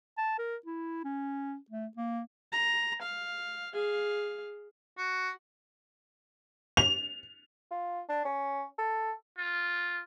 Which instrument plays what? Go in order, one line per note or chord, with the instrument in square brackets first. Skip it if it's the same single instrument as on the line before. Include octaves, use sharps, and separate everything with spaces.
[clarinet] A5
A#4
E4
C#4
A3
A#3
[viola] A#5
F5
G#4 F5
[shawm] F#4
[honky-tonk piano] F7
[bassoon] F4
D4
C#4
A4
[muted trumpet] F4